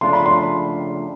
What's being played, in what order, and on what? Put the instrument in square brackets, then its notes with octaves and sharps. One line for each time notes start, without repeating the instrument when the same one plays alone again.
[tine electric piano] C#3 F3 A3 D4 F4 [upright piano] C6
[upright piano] B5
C6